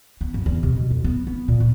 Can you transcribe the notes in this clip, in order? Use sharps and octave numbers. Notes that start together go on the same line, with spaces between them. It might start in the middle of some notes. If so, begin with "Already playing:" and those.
B3
F#2
E2
C3
B2
F2
B3
B3
A#2
B3